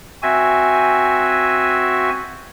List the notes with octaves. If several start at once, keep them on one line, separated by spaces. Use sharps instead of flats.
C4 F#4 E5 G#5